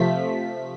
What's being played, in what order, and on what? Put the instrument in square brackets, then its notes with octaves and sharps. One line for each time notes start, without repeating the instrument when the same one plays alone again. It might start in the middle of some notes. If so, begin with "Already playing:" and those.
Already playing: [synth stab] C3 F3 A3 B6